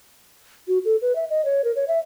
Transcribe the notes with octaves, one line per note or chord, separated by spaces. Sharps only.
F#4
A4
B4
E5
D#5
C#5
A#4
C#5
E5